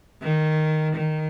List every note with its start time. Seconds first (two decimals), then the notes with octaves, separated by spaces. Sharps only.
0.23 D#3
0.95 D#3